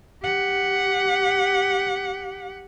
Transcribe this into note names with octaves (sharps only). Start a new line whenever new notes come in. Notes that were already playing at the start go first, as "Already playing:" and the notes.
G4 F#5